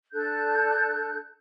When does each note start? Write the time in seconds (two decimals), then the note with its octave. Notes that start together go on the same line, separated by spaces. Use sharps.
0.13 D4 A4 F#6 G6